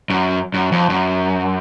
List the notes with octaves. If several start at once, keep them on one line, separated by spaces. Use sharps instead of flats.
F#2
F#2
F2
F#2